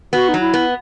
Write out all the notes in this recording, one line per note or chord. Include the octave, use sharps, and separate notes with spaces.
B3 F#4
D#4
F#3
E4
B3